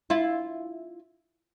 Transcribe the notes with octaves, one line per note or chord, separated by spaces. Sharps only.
E4 F4